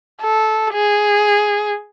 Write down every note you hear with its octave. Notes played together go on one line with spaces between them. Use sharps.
A4
G#4